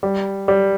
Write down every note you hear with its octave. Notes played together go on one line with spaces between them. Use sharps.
G3
G3